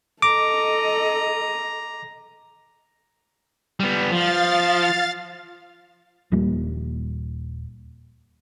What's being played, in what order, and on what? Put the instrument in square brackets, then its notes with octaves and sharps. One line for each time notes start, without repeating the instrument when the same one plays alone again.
[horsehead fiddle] A4 D#5 [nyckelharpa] A#5 [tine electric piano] D6
[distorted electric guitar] G3 B3
[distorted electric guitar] F3 [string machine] F5 A6
[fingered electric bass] D#1 F3 G3 A#3